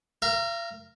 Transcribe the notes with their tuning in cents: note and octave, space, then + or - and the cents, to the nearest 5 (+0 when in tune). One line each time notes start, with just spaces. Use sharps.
A#4 -5 F5 -45